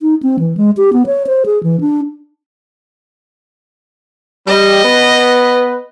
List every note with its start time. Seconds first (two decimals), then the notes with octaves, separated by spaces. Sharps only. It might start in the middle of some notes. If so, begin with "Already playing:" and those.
0.01 D#4
0.23 C4
0.39 E3
0.57 G#3
0.77 G4
0.93 B3
1.06 C#5
1.27 C5
1.46 G#4
1.63 E3
1.81 D4
4.47 G3 D#5
4.84 B3 B4